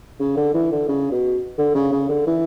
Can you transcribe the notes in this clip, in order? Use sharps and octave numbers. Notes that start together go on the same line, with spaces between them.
C#3
D3
E3
D3
C#3
B2
D3
C#3
C#3
D3
E3